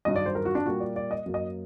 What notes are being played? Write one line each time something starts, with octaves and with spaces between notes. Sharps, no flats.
G2 D#3 F#3 D#5
D5
C5
A#4
F#4
D4
A#2 G3 A#3 F#4
D5
D5
D#5
F#2 F#3 A#3
D#5